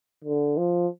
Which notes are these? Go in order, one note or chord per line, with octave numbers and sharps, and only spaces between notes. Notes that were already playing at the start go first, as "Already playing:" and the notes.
D3
F3